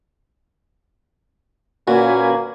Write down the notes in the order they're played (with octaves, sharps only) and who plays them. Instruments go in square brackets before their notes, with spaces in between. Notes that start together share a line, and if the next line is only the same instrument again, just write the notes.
[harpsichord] A#2 [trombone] A#3 [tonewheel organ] C#4 B4 G#5 [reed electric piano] F#4